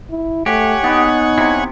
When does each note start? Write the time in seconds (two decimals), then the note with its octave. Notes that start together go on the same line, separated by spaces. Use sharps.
0.10 E4
0.46 A3 G4 C#5 F#5 G#5
0.84 B3 D#4
1.38 C3 E4